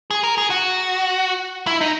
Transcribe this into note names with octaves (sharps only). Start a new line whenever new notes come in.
G#4
A#4
G#4
F#4
E4
D#4